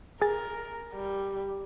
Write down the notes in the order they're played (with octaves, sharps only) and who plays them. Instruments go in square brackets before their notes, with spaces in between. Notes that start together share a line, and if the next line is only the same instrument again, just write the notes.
[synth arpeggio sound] G#4 A6 [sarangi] A#4
[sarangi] G3